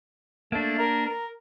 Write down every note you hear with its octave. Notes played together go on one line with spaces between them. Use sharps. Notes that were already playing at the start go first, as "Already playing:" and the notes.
A3 A#3 D4
A#4
A#4